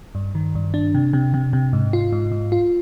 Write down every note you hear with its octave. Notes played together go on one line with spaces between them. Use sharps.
G2
D#3
G2
D4
C3
C3
C3
C3
G#2
F4
G#2
G#2
F4